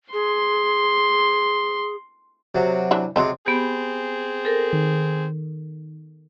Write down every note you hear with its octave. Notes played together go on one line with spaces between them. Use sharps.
G#4 C6
C3 F#3
E3 D4 E4
C3 F#3 G#3 C4 C5
B3 C4 G4 G#4
A4 A#4
D#3